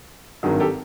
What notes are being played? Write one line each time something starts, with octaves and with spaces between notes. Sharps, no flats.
G#1 G2 D#3 F#3 F#4 G#4
G4 A4